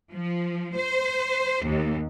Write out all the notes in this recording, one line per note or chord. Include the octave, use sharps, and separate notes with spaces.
F3
C5
D#2